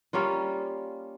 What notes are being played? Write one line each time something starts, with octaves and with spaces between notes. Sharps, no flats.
G3 A#3 C#4 F4